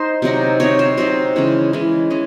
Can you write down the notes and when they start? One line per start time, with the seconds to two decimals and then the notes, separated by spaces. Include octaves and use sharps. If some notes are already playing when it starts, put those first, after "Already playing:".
Already playing: D#4 C5
0.22 C3 F#3 C4 D#4
0.60 C3 F#3 C4 D#4 C#5
0.79 C5
0.97 C3 F#3 C4 D#4 C5
1.36 C#3 E3 G#3 C#4
1.73 C#3 E3 G#3 C#4
2.10 E3 G#3 C#4